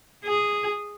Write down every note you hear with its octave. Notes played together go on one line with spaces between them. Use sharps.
G#4